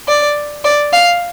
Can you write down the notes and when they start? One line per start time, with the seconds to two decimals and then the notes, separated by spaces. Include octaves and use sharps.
0.08 D5
0.65 D5
0.93 F5